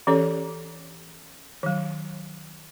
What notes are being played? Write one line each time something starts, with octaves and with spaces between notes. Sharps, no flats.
E3 C#4 G4 A4 C#5
D#3 F#3